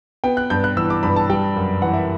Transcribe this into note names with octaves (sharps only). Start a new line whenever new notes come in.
B3 G5
F#6
G2 G6
F#6
E3 E6
D6
G2 B5
A5
G3 G5
F#2
E3 F#5
E5